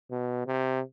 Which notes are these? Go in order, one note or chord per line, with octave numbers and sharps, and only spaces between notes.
B2
C3